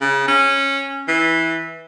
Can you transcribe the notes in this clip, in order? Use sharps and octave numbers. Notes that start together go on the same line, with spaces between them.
C#3
C#4
E3